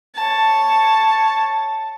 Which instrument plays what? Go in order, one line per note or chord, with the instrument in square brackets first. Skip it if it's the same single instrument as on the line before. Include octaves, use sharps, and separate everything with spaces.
[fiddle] C#5 A5